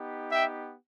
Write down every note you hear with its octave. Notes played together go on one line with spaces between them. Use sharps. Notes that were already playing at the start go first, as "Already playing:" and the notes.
Already playing: B3 D#4 G4
E5 G5